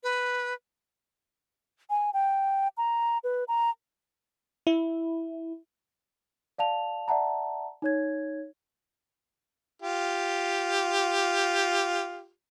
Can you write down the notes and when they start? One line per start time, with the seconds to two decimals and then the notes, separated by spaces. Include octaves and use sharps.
0.03 B4
1.90 G#5
2.14 G5
2.77 A#5
3.24 B4
3.48 A#5
4.67 E4
6.58 D5 F5 A5 F7
7.08 D5 E5 F#5 A5 A#5
7.82 D#4 C#5 G#6
9.82 F4 G4